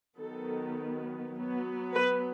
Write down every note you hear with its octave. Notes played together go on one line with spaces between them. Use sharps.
D#3 F#3 B3 A4
F#3 B3
B4